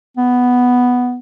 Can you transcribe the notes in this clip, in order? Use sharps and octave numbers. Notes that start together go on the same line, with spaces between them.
B3